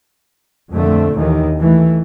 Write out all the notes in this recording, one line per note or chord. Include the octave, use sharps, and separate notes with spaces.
F2 A#2 D3 A3
D#2 D#3 E3
E3 A3